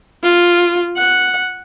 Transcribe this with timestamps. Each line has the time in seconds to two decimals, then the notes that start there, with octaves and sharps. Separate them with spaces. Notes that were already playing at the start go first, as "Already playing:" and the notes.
0.23 F4
0.97 F#5